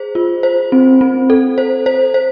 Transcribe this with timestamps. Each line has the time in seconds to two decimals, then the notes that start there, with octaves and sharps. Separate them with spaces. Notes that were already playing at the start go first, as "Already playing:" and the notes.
Already playing: G#4 C5
0.15 F4
0.43 C5
0.72 C4
1.01 C4
1.30 A4
1.58 C5
1.86 C5
2.14 C5